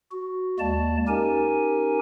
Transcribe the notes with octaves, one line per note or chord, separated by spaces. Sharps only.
F#4
D#2 G#3 A#3 D5 A5
C#4 D#4 G4 A#4 G#5